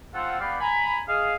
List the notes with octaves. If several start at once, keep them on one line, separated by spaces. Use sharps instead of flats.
C4 F4 A4 F#5
B3 G4 D5 F5
G#5 A#5 B5
G#4 D#5 F5